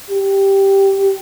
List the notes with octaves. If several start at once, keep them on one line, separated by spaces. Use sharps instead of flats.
G4